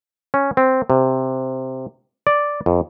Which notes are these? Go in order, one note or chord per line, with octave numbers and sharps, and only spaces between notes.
C#4
C4
C3
D5
F2